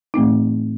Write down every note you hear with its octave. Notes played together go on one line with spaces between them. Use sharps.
A2 E3 A3 C4 D#4